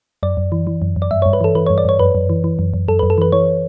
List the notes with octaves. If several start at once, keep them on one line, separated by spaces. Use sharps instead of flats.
F#2 D5
F#2
E3
E3
F#2
F#2
D5
G2 E5
C#5
G2
B4
E3 A4
E3 B4
C#5
G2
D5
G2 C#5
F#2 B4
F#2
E3
E3
F#2
F#2
F#2 A4
B4
F#2
A4
E3 B4
E3 C#5